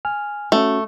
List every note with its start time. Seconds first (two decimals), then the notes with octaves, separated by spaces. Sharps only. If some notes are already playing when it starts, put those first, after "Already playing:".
0.05 G#5 F6
0.52 A3 C#4 F#4